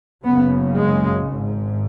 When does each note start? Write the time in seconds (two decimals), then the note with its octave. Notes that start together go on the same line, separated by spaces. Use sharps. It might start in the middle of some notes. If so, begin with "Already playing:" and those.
0.24 F#1 F#2 C#3 B3
0.76 G#3
1.27 G#1 G#2